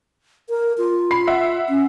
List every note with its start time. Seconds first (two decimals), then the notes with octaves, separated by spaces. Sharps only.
0.49 A#4
0.78 F4
1.11 B5 C7
1.27 E5 F#5
1.69 C#4